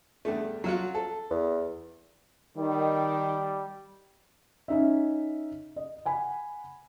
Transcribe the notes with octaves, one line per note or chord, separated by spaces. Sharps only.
E2 G2 A3
F#3 F4 F#4
A4
E2
D#3 G3
C#4 D#4 E5
D#5
F#5 G#5 B5